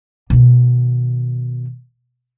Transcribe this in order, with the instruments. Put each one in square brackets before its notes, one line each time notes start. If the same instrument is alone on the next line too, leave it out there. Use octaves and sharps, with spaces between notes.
[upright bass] B2 D#3